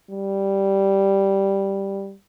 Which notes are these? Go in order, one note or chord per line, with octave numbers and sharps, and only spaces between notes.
G3